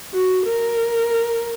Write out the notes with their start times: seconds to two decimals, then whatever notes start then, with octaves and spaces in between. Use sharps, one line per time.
0.13 F#4
0.46 A#4